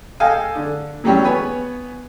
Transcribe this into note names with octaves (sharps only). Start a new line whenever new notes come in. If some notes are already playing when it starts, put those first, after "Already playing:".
A4 D#5 F5 G5 G#5
D3
E3 F#3 G3 C#4 G4 C#5
B3 B4 C#5 G#5